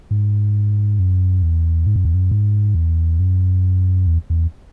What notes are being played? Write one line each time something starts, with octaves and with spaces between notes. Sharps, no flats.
G#2
F#2
E2
G#2
F#2
E2
F#2
G#2
E2
F#2
E2
E2